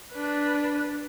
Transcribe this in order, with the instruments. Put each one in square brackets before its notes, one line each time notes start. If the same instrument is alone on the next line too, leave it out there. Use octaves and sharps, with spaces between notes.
[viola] D4 B4